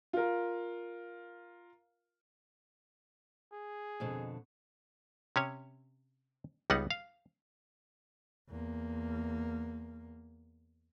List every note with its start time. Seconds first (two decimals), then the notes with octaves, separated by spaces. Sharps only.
0.13 F4 A#4
3.53 G#4
4.00 F2 B2 D3
5.36 C3 C#4 C#5
6.70 C#2 G3 B3 D#4 F#5
6.91 F5
8.50 E2 A#3